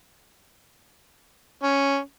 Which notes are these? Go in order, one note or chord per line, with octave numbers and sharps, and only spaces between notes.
C#4